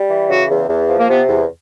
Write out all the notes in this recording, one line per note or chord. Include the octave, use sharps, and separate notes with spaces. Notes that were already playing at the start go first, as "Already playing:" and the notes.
Already playing: G3
E3
C#3 F#3 F#4
E2
E2
F3
A#3
C3 B3
E2